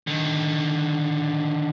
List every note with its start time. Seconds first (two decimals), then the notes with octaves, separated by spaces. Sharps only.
0.07 D3 D#3